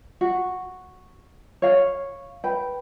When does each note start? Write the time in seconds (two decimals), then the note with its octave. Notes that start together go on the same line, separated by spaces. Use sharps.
0.21 F#4
1.62 C#5 F5
2.44 B4 G5